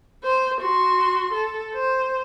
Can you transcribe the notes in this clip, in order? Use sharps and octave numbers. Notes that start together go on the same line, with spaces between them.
C5
F#4 C6
A4
C5